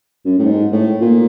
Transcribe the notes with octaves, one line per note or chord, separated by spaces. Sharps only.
F#2
A2
G#2
A2
A#2